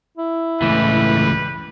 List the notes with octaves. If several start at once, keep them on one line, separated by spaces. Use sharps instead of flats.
E4
C#2 A2 E3 G3 B4